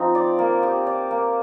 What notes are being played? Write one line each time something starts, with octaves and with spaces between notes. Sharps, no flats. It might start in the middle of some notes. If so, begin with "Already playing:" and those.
Already playing: F3 C4 D#4
D5
A#3
G4
D5
A#3